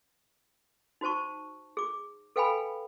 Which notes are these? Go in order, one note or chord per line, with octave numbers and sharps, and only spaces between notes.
D#4 F#4 C5 A5 C#6
G#4 D6
A4 B4 F5 G5 G#5 B5